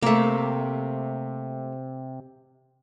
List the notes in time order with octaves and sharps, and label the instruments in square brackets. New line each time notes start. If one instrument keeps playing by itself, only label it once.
[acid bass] C3 [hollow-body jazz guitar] A3 A#3